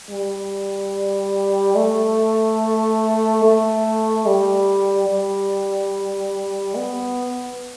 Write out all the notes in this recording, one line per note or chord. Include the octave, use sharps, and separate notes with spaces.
G3
A3
A3
G3
G3
B3